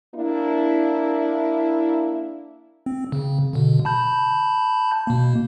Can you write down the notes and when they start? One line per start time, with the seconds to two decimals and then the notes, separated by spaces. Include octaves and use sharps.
0.15 A#3 D4 E4
2.86 C4
3.12 C#3
3.53 B2 D3
3.85 A5 B5 G6
5.07 B2 A#3